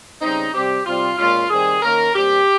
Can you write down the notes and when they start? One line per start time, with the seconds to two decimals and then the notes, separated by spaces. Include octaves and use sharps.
0.20 C#3 G3 C4 D#4
0.53 C3 G3 C4 G4
0.85 C3 G3 C4 F4
1.17 A#2 G#3 C#4 F4
1.50 D#3 G3 C4 G#4
1.82 D#3 A#3 C#4 A#4
2.15 A#2 G3 C4 G4